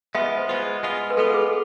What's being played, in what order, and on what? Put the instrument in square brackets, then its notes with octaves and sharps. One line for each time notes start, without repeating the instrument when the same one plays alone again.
[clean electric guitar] G#3 B3 F4 [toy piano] E5
[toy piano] C5
[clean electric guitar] G#3 B3 F4
G#3 B3 F4
[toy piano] B4
[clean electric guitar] G#3 B3 F4 [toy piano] A4
[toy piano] G#4